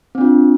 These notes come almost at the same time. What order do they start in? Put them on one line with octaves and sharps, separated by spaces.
C4 D4 F4